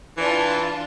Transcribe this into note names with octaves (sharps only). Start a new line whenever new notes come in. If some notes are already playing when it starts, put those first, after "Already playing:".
E3 D4 F4 A5